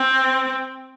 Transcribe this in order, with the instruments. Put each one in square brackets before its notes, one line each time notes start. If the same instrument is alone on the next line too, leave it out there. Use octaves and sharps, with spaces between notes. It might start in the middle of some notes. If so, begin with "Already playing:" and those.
Already playing: [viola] C4